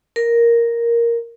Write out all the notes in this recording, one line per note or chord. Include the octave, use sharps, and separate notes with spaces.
A#4